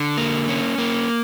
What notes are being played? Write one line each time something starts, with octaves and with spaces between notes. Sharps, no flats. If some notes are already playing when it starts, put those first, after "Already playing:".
Already playing: D3
A#3
C#4
A#3